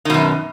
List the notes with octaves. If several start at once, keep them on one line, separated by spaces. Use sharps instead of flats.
F#2 B2 D#3